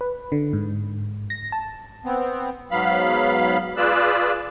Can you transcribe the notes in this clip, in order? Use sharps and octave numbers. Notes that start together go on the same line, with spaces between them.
B4
D3
G#2
A#6
A5
B3 C4
G#2 F#3 B3 F5 B5
F4 G#4 B4 D5 E6 F#6